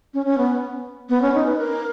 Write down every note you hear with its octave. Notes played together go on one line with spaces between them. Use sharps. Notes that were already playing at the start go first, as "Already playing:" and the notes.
C#4
C#4
B3
B3
C#4
D#4
B4
A#4